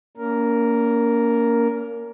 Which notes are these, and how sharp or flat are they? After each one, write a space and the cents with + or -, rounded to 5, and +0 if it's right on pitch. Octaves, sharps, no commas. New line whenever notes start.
A#3 +0 C#4 +40 A#4 +0